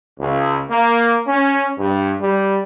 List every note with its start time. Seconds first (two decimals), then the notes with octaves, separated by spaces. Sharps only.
0.20 C#2
0.70 A#3
1.28 C#4
1.78 G2
2.20 G3